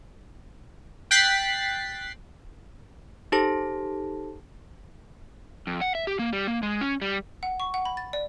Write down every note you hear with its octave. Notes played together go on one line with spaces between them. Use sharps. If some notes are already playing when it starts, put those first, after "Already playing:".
G5 F#6 A6 B6 C7
D#4 G4 A4 C5 A5 A#6
F2
F#5
E5
G4
A#3
G3
A#3
G#3
C#4
G3
F#5
C#6
F#5
B5
A6
D5